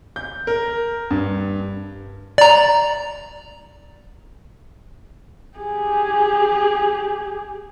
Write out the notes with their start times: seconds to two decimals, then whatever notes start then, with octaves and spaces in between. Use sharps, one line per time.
0.16 G6
0.47 A#4
1.11 G2
2.38 D5 A#5
5.58 G4 G#4